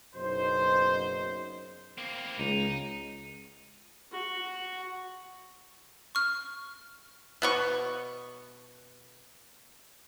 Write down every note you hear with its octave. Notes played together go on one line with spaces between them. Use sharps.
F#1 F#2 B2 D#4 C5
A#3 C4
C#2 D#4
F#4
C#6 F6
B2 B3 C#6